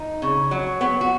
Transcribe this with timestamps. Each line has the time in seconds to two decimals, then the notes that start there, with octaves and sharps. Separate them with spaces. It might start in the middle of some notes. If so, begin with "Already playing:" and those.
Already playing: D#4
0.22 C#3
0.51 F#3
0.81 F#3 B3
1.01 F#4